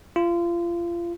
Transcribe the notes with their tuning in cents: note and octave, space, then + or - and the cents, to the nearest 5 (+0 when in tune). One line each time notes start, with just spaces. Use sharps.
F4 -30